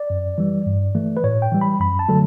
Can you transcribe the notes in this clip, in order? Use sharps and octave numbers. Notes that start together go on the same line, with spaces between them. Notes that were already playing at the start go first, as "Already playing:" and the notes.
Already playing: D5
F#2
E3 G3
G2
E3 A3
B4
A2 C#5
G5
E3 G3
B5
F#2 B5
A5
D3 F#3 A3 A4